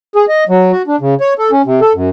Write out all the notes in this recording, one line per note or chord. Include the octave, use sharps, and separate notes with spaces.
G#4
D#5
F#3
F#4
D4
C#3
C#5
A4
C#4
C3
A4
F#2